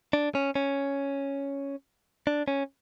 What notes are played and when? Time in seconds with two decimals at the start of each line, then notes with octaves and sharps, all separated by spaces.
0.13 D4
0.35 C#4
0.55 C#4
2.27 D4
2.48 C#4